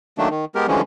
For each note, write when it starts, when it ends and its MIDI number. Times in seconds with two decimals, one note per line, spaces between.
0.18 0.29 51
0.18 0.29 54
0.18 0.29 57
0.18 0.29 58
0.18 0.29 62
0.30 0.45 51
0.55 0.66 56
0.55 0.66 59
0.55 0.66 67
0.55 0.66 70
0.68 0.81 50
0.68 0.81 52
0.68 0.81 53
0.68 0.81 55
0.68 0.81 56
0.68 0.81 61